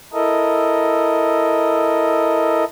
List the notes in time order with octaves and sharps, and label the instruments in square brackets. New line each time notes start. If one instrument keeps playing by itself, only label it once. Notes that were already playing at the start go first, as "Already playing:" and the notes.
[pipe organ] E4 A4 A#4 D#5